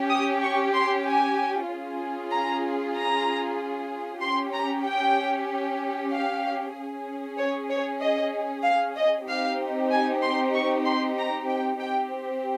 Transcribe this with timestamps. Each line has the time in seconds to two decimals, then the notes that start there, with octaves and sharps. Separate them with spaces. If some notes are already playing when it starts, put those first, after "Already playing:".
Already playing: C#4 G4
0.10 D#6
0.43 C#6
0.74 C6
1.06 G#5
1.69 C#4 F4 G#4
2.32 A#5
2.95 A#5
4.22 C#4 G4 C6
4.54 A#5
4.84 G5
6.12 F5
6.75 C#4 G#4
7.38 C#5
7.69 C#5
8.01 D#5
8.64 F5
8.96 D#5
9.28 C4 D#4 G4 F5
9.91 G#5
10.23 C6
10.54 C#6
10.85 C6
11.18 A#5
11.50 G5
11.81 C4 G4 G5